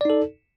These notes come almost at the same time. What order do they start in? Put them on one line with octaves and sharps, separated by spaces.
D5 D#4 A4